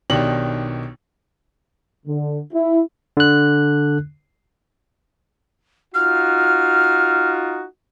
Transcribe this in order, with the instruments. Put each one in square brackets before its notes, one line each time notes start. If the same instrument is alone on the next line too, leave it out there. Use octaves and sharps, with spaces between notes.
[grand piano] B1 B2 D#3 D4 G4 F#7
[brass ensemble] D3
E4
[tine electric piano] D3 F#6
[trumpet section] D#4 F4 F#4 [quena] F6